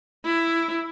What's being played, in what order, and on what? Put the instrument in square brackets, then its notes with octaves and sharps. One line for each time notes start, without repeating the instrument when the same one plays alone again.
[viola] E4